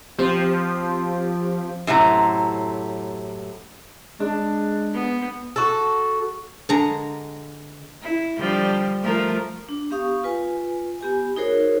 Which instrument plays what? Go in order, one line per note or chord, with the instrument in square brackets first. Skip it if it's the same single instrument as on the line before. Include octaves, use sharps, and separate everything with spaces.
[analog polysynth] F3 [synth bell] C4 G4
[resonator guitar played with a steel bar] F#2 A2 C3 A#5
[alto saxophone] G#3 [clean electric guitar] D4
[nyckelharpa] B3
[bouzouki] F#4 A4
[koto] D3 G#3 A#5
[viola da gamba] E4
D3 F3 G3
F3 A3 A#4
[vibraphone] D4
B3 G4 F5 C#6 D#6
F4 B4 G#5
B3 G4 G#5
D#4 F#4 G#4 A#4 C5 C#5